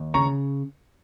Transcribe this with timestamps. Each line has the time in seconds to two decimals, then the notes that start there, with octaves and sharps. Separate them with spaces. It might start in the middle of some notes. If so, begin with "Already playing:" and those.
Already playing: D#2
0.14 C#3 A#5 C#6